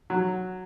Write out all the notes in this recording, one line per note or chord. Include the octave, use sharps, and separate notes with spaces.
F#3